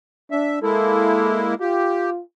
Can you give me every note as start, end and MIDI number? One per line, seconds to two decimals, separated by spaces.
0.31 0.59 62
0.31 0.59 76
0.62 1.55 56
0.62 1.55 58
0.62 1.55 64
0.62 1.46 69
1.60 2.21 65
1.60 2.10 67